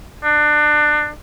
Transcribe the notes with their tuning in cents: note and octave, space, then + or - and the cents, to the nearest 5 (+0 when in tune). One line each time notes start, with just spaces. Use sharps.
D4 +25